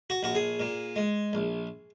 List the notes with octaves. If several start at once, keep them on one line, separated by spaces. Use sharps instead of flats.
F#4
A#1 F#4
G#4
A#2
G#3
A#1